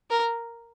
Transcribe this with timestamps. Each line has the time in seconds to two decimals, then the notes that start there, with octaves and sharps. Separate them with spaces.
0.10 A#4